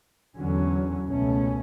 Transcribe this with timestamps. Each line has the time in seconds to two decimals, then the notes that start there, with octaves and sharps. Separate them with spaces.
0.38 E2 D3 F#3 C#4
1.09 C#2 B2 A3 C#4